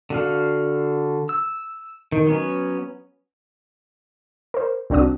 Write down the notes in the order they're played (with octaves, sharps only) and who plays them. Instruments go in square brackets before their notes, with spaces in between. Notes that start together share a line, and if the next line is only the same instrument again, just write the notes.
[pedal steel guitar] D3 F#4 F5
E6
D#3
F#3 B3 C#4
[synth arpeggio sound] A#4 C5
C2 C4 D4 F#4 D#6